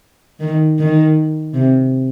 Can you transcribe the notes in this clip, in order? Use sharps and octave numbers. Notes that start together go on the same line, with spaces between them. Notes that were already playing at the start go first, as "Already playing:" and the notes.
D#3
D#3
C3